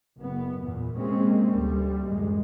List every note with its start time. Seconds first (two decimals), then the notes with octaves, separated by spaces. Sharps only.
0.18 F#1 B3
0.61 E2 A#2
0.95 C3 G#3 A#3 C4 C#4
1.48 D2 G3
2.07 A1 F#2 G#3